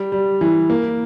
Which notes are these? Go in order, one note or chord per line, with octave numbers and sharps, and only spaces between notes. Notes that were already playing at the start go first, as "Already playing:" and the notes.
Already playing: G3
G3
E3
A#3